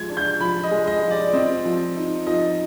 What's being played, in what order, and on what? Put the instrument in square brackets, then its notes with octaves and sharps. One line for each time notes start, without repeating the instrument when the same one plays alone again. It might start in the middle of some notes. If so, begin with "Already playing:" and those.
Already playing: [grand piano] F3 G#3 G#6
D4
G6
F3 B5
D#5
G#3
D#5
F3
D5
C4 D#5
F3
D#4
F3 D#5